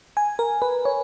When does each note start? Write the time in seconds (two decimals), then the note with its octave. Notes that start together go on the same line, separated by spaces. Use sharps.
0.17 G#5
0.39 A#4
0.62 B4
0.85 C#5